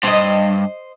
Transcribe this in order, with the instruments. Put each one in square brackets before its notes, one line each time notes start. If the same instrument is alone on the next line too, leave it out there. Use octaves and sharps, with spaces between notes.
[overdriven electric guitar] G2 [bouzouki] C5 D#5